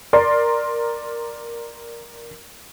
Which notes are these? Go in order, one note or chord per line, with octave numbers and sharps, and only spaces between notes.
A#4 D5 C6